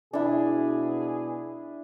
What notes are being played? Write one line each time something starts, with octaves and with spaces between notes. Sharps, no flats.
B2 D4 E4 G#4